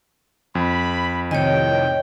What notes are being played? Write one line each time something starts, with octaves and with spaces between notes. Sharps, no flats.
F2 B5
A2 C3 D#3 C#5 D#5 G5